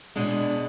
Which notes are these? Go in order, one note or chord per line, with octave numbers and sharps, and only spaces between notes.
E2 B2 G#3 D4